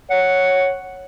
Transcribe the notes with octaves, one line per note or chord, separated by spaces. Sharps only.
C#5 F#5